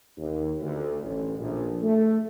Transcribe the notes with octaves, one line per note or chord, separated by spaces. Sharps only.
D#2
D2
A1
A#1
A3